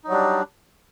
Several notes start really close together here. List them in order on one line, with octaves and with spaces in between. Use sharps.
D#4 F#3 G3 D4